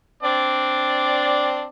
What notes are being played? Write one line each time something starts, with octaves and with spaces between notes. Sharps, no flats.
C4 D4 D5